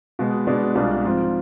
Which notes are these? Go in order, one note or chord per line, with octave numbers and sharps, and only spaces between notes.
B2 G#3 B3
B2 G#3 B3 D4
C2 B2 G#3 D4 F4
G#2 F3 C4 F4